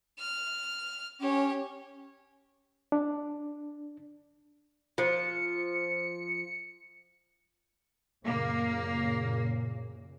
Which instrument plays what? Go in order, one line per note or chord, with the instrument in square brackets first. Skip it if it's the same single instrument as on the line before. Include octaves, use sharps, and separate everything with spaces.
[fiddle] F6
[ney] C#4 [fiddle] G4 C#5
[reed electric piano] D4
[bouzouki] F3 [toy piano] F4 C5 [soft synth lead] C#7
[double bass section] F#2 A#2 C#3 [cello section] A#3